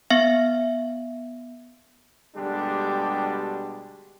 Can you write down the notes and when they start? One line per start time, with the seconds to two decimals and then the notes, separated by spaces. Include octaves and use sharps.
0.10 B3 E5 F5
2.36 B2 D3 G3 G#3 D4 G4